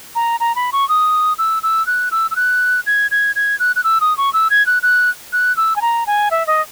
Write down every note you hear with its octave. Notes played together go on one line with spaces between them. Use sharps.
A#5
A#5
B5
C#6
D#6
E6
E6
F#6
E6
E6
F#6
G#6
G#6
G#6
F#6
F#6
E6
D#6
C#6
E6
G#6
F#6
F#6
F#6
E6
G#5
A#5
G#5
E5
D#5